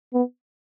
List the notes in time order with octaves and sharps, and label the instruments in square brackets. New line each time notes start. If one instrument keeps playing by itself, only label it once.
[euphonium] B3